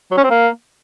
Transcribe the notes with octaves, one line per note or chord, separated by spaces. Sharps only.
F#3
C#4
C4
A#3